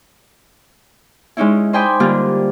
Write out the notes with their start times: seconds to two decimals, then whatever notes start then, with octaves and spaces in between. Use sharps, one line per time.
1.37 G#3 C#4 D#4 E4
1.73 C5 D#5 G5 G#5 B5 D6
2.00 D3 G3 A#3 D4 F4